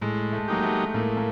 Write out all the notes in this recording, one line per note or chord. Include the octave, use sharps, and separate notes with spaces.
A2 G#3
A3
F#3 A#3 D#4 G4
A3
A2 A#3
A#3